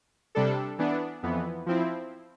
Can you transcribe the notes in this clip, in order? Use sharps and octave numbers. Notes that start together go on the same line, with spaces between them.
C3 G3 D4 A4
E3 B3 D4
F2 E3 B3
F3 C4 E4